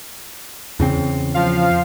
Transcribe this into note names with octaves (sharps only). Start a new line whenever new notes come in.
E2 C#3 C4
F3 F5